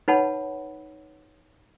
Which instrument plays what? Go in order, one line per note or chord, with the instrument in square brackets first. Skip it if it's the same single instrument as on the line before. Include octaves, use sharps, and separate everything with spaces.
[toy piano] D#4 B4 C#5 F#5 A5 B5